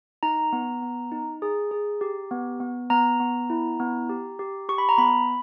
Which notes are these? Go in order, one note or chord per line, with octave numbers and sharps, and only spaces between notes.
D#4 A#5
B3
B3
D#4
G#4
G#4
G4
B3
B3
B3 A#5
B3
E4
B3
G4
G4
G4 C#6
B5
A#5
B3 B5